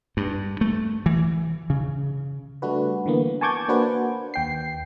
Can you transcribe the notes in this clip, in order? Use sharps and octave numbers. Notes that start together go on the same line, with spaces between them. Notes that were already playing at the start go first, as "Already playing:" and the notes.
G2
A3
E3
C#3
G3 A3 D4 F#4 B4
D3 E3 A#3 B3
G#5 A5 C#6 D6 G6 G#6
A#3 D4 F#4 B4 C5
D#2 G5 C7